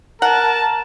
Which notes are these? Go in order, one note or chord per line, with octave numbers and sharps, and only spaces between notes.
A#4 F#5 A5